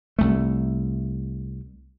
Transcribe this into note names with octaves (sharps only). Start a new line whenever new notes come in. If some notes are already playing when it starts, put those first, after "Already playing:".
C2 A3